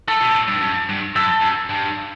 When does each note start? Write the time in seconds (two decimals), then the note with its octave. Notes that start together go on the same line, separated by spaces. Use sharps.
0.08 A3 A4
0.21 B2
0.35 A2
0.48 G2
0.61 F#2
0.89 G2
1.16 F#2 A4
1.42 F#2
1.70 G2